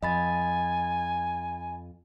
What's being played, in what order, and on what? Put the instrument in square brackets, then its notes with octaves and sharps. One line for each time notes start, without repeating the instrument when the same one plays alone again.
[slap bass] F2 [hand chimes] D#5 B5 A6 [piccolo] G#5